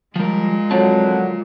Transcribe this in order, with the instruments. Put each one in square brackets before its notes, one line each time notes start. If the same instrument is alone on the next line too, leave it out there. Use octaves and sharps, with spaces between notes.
[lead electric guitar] F3 G3 [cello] G#3 [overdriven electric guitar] F4 A#4
[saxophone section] D3 F3 F#3 [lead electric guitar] C4 A5